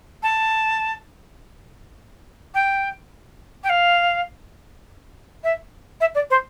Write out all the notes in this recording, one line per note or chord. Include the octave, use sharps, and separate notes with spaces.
A5
G5
G5
F5
E5
E5
D5
C5